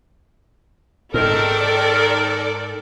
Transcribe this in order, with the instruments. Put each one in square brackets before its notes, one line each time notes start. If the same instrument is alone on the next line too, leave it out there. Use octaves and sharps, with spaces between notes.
[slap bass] G#2 [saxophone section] D#3 C4 A#4 [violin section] A4 D5